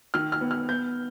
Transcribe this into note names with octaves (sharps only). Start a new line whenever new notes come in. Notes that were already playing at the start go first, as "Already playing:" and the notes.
D#3 F6
F6
B3
F6
B3 G6